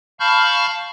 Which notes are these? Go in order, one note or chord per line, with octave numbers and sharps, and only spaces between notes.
F5 A5 B5 C#6 F6 G6